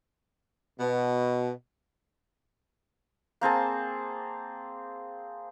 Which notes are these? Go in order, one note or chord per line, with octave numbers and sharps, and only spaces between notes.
B2
A#3 C4 G#4 A5